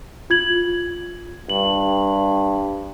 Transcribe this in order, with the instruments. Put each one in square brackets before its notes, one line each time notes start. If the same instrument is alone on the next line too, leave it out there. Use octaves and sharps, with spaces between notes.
[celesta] F4 G#6 F#7
[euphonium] G2 [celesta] F#7